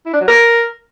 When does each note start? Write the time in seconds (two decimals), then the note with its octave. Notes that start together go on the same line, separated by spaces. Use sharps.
0.06 E4
0.13 D4
0.20 F#3
0.28 A#4